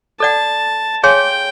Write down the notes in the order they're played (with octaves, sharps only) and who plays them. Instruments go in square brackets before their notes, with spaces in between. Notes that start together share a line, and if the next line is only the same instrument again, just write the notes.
[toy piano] A4 D5 F#5 [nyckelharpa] A5
[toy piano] G#4 C#5 F5 G#5 C6 [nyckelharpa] G5